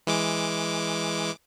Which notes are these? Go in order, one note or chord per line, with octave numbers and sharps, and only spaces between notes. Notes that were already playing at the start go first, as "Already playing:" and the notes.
E3 G#3 D6